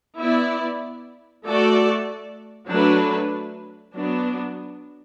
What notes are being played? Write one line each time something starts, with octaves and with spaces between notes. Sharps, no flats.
B3 E4 D5
A3 F#4 A4 D5
F#3 A3 D4 B4
F#3 B3 D4